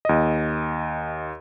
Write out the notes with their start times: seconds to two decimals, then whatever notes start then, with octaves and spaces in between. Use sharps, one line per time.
0.05 D#2 D#5